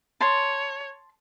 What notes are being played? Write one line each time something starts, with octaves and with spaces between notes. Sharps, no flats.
C#5 A5 C6